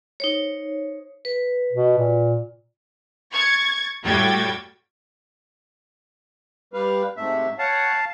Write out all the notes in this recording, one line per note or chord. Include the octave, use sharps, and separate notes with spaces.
D#4 C5 C#5
B4
B2
A#2
C#6 G#6 A6
A2 G3 F#4 G5 G#6 A6
G3 B4 F5
G#2 C3 A3 E5
C#5 F5 F#5 A5